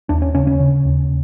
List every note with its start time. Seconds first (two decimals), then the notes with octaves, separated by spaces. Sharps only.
0.09 D#2 D4
0.22 C#4
0.35 C#3 C#4
0.47 C#4
0.60 C#3
0.85 D#2